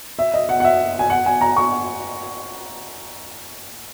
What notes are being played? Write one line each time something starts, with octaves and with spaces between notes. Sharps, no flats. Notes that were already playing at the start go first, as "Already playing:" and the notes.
E5
D#5
F#5
F#5
E5
G#5
F#5
G#5
A#5
C#6